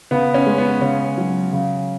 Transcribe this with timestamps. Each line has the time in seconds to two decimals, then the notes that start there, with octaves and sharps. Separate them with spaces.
0.11 C#3 B3
0.34 C#4
0.46 G#3
0.58 B3
0.82 C#3 C#4
1.18 F#3
1.53 C#3